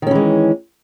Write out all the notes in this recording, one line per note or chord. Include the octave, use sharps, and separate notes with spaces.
D#3 E3 G#3 C#4